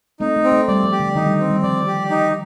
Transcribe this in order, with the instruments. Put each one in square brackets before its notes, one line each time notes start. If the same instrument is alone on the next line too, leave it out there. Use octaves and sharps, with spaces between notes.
[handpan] A3 C4 [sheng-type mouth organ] D#4
[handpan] A3
[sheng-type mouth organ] C4
[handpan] A3
[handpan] G3 [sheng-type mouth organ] D5
[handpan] F3
[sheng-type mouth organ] G4
[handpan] D3
[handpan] D#3 [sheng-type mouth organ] D#4
[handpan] G3
[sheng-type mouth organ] C4
[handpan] G3
[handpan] F3 [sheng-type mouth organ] D5
[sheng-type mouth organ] G4
D#4